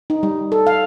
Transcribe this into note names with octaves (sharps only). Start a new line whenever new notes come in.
D#4
G3
A4
F5